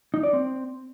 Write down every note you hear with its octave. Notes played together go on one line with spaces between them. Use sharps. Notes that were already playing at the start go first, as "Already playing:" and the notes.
D#4
D5
C4